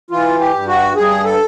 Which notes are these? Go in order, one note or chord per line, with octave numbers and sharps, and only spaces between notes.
E3 F4
G4
G2
F#4
G2 G#4
A4